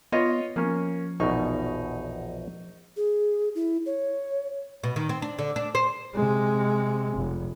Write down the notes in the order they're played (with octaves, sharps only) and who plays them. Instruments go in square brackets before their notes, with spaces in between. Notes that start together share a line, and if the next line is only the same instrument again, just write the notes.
[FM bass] B3 [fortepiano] F4 C#5 D#5
[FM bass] F3 [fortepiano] A#3 C#4
[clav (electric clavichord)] A#1 E2 B2 [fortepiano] D#4 C#6
[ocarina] G#4
E4
C#5
[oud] B2
D#3
C4
D4
D3
D4
C5
[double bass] C3 G#3
F1